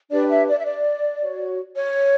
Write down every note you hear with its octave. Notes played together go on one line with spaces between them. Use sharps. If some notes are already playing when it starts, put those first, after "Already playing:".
D4 G4 B4 D5
E5
D5
E5
D5
F#4 C#5
C#5